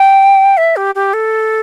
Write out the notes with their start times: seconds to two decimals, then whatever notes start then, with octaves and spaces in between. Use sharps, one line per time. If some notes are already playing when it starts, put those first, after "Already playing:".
Already playing: G5
0.57 E5
0.76 G4
0.95 G4
1.13 A4